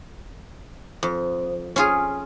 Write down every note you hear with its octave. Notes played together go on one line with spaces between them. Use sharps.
F2
C#4 F4 G#4